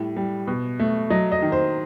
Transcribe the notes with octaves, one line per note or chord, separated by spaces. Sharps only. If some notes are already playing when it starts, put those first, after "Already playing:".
Already playing: A2 G3
G3
B2
A3
F#3 D#5
D#5
D#3
C5